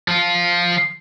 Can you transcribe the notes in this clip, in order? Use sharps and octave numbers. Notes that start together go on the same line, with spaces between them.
F3 F4